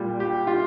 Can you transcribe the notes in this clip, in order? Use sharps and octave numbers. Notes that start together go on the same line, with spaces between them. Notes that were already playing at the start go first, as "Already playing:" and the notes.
Already playing: A#2 G3
G4
F4